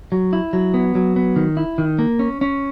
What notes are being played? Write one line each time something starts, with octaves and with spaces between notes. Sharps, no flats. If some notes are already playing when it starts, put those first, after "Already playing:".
F#3
E4
F#3
B3
F#3
B3
D#3
E4
D#3
A#3
C#4
C#4